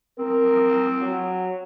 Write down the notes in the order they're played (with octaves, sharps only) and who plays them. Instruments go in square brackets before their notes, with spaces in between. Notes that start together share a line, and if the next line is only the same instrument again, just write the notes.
[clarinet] C4 [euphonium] A#4
[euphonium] F#3